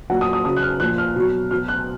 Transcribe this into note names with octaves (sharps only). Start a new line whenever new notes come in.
A#2 F#3 F#5
D#6
D#6
C#3 F#3 D#6
F#6
F6
A#2 F3 F#6
F6
B2 F#3
B2 F#3 F6
F#6